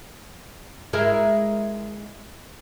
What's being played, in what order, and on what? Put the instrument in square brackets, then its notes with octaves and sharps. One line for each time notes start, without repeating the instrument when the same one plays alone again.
[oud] G#3 E4 A#4